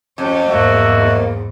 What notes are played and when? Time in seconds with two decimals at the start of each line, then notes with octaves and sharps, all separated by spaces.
0.18 F2 C#4 G4
0.49 E2 G#2 A#3 F#4 E5